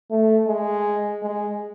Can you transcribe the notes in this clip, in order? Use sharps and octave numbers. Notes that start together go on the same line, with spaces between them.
A3
G#3
G#3